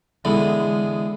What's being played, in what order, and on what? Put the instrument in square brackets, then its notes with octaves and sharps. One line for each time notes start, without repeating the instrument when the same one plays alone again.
[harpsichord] D3 E3 B3 [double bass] G#3